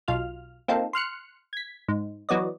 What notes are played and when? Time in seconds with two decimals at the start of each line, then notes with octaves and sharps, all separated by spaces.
0.08 B1 F4 F6
0.68 A#3 C4 D#4 F4 A4
0.93 C6 F6 F#6 C#7
1.53 G#6 B6
1.88 G#2
2.29 E3 F#3 B3 D5 D#5